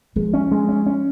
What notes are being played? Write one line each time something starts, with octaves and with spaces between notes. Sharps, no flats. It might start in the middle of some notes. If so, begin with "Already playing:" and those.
F3 G#3
C#4
G#3
C#4
C#4